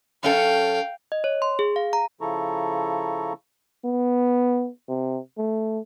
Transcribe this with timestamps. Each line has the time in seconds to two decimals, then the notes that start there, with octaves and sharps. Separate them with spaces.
0.23 F#2 C#4 A4 F5 G5
1.12 D#5
1.24 C#5
1.42 C6
1.59 G#4
1.76 F5
1.93 A#5
2.21 C#3 F3 E4 A4 A#5 C#6
3.85 B3
4.89 C3
5.38 A3